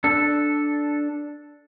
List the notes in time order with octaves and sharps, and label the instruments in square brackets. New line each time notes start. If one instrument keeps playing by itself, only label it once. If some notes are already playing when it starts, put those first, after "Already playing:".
[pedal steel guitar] D4 A4